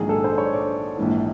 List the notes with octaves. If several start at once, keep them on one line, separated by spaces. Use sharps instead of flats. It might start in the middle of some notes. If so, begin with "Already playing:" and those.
Already playing: A#1 G#2 D#3 F#3 G#4
A4
C5
C#5
D5
A#1 G#2 E3